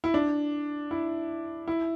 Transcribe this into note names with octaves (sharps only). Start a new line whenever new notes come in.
E4
D4
E4
E4